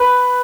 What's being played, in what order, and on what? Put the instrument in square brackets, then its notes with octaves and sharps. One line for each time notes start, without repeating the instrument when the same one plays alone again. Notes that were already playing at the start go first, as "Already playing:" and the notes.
Already playing: [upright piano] B4